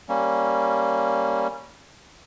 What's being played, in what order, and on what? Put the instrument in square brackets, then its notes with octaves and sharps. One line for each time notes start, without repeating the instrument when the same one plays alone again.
[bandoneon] G3 A#3 C#4